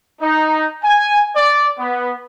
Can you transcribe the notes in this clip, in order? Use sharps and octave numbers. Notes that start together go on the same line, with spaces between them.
D#4
G#5
D5
B3